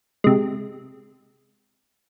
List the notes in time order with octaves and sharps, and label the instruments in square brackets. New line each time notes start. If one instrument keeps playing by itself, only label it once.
[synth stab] C3 G#3